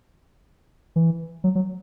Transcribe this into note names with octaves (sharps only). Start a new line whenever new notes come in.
E3
F#3
F#3